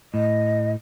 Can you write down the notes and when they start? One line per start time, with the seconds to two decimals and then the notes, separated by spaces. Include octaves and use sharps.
0.14 A2 D#5